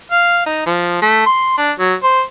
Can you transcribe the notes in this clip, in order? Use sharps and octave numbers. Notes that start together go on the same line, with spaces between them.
F5
D#4
F3
A3
C6
D4
F#3
C5